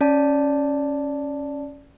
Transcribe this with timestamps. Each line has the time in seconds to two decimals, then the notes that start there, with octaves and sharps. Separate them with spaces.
0.01 C#4 D5 A5